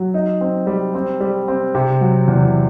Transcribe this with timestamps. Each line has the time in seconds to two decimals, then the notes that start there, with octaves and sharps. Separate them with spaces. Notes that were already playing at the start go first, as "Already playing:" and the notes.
Already playing: F#3
0.14 D#4
0.41 C4
0.67 G3
0.94 C4
1.20 G3
1.48 C4
1.75 C3
2.01 F#3
2.28 E2